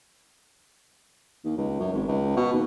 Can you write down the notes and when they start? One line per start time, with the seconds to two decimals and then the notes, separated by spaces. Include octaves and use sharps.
1.45 D#2
1.57 C#2
1.80 F#2
1.93 G#1
2.08 C#2
2.37 B2
2.52 D#2